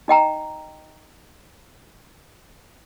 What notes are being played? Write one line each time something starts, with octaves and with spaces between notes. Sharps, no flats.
D#4 D#5 G5 A#5